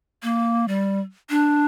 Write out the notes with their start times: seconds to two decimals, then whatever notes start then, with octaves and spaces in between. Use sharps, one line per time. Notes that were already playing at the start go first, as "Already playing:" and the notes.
0.23 A#3
0.68 G3
1.30 D4